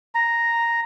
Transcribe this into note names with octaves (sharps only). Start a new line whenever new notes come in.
A#5